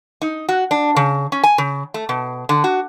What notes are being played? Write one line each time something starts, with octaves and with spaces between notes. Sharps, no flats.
D#4
F#4
D4
C#3
C#4
G#5
C#3
A3
B2
D3
F#4